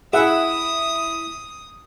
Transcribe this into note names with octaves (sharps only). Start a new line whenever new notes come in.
E4 G#4 E5 F#5 D#6